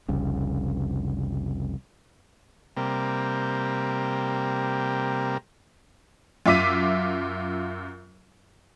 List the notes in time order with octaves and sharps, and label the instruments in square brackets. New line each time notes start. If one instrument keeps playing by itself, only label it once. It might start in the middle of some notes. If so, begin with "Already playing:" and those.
[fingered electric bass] F1 C2 C#3
[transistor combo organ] C3 G3 A#3
[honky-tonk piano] F#2 F4 E5 D6 B6 D#7